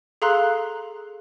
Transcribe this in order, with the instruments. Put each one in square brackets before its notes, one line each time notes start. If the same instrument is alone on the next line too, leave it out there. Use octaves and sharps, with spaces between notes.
[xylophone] G#4 A4 F5 A#5 C6 F#6